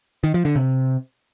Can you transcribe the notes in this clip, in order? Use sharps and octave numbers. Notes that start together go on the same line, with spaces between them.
D#3
F3
D3
C3